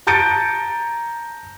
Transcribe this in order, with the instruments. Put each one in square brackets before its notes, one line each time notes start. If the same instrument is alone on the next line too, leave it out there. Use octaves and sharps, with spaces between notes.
[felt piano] A5 A#5 G6 A6 C#7 D7